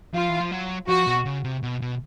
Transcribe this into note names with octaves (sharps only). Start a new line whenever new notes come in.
F3 F4
E3
F3
F#3
F3 F#4
B2
C#3
C3
B2
B2